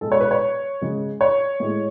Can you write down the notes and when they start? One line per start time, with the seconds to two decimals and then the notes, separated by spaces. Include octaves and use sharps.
0.01 B2 G#3 A4
0.12 C#5
0.21 B4
0.31 C#5
0.81 C#3 G#3
1.21 C#5
1.60 A2 G#3